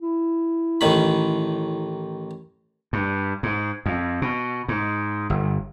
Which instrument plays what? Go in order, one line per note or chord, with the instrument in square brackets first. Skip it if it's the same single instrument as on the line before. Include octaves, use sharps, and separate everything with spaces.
[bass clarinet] E4
[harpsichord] A1 D#3 B5
[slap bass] G2
G#2
F2
B2
G#2
G1